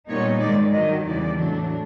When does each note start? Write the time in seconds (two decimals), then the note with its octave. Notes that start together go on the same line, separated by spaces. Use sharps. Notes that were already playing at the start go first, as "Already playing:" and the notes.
0.08 A#2 G3 B3 D#4 C#5
0.40 G#2 D#3 G#3 D5
0.73 G2 D#3 F#3 D#5
1.06 E2 C#3 E3 G3 D5
1.38 A2 F#3 A3 D4